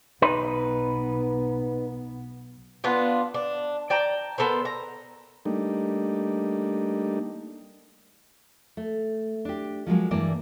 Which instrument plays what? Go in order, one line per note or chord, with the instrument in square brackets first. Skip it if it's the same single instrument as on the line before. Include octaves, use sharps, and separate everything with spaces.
[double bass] B1 B3 [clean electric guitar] D#4 B4
[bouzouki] B3 D4 F4
D4
D5 G5 A5 A#5
B3 A4 A#4 C5
A#5
[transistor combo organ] G3 A3 A#3 D4 D#4
[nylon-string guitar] A3
D4 G4
F3 F#3 G#3 A#3
G2 E3 A#3 D5 A5